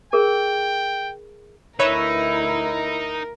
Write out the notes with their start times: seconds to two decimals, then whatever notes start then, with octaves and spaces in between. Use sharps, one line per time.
0.13 G#4 A#4 G5
1.79 D2 D#4 E4 A#4 B4 C#5 E5